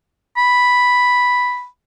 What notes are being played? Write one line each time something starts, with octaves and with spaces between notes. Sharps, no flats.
B5